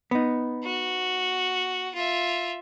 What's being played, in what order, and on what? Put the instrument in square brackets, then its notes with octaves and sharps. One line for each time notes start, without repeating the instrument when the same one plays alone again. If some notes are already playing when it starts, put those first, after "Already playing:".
[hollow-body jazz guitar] B3 D#4
[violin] F#4
F4 E5